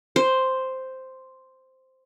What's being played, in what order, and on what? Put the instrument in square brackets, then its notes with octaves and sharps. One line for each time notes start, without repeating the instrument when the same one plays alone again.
[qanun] C5